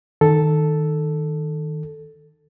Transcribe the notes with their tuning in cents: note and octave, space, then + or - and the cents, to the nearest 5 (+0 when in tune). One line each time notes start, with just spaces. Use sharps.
D#3 +0 A4 +0